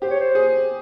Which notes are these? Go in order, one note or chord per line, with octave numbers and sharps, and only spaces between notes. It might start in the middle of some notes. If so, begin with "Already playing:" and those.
G4 C5
C#5
C5
G#4